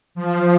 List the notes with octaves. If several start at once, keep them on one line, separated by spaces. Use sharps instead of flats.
F3